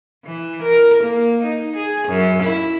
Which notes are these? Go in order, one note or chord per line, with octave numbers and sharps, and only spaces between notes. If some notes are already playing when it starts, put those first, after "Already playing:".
E3
A#4
A#3
D#4
G#4
F#2
E4